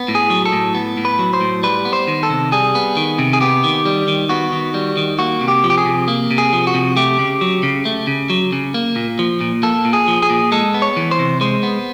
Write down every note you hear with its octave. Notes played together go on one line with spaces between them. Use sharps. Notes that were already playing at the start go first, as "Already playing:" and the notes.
Already playing: B3
A2
G#4
F#3
A4
A2
B3
A2
B4
F#3
C5
A2
G3 B4
B3
C5
D#3
A4
C3
G3 G#4
B3
D#3
C3
G#4
B3 G4
D#3
G3
D#3
B3 F#4
D#3
G3
D#3
A#3 F#4
C3
G4
F3
G4
G#4
C3
A#3
C3
G#4
F3
F#4
C3
A3 G4
C#3
F#3
C#3
A3
C#3
F#3
C#3
A#3
A#2
F3
A#2
A#3 A4
A#2
G#4
F3
G#4
A#2
G#3 A4
B3
C#5
E3
C5
C3
G#3 C5
B3